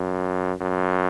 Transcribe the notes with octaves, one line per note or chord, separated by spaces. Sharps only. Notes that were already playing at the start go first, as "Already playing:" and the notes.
Already playing: F#2
F#2